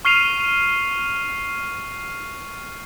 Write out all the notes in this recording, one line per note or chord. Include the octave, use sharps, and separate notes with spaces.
C#6 F6 C7 D#7 F7